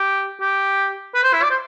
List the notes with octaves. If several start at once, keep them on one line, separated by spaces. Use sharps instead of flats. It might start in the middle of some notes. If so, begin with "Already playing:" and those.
Already playing: G4
G4
B4
C5
E4
D5
C5